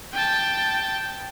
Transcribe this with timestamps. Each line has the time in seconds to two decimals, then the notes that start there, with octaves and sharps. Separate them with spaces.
0.13 G5 A5